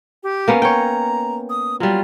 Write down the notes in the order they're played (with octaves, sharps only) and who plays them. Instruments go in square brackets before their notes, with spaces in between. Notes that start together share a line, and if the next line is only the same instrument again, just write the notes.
[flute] G4
[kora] A#3 B3 C#4
[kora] C#5 G5 [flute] A#5
[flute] D#6
[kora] F#3 G3 [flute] F4